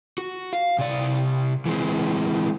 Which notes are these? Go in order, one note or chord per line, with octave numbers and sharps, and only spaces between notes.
F#4
F5
C3 D5
E3 G#3 C4